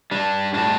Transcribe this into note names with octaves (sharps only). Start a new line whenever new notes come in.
G3 D4
A2 D4